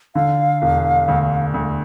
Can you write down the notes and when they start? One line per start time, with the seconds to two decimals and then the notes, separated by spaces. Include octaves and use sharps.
0.15 D3 F5
0.62 E1
1.08 D2
1.54 D2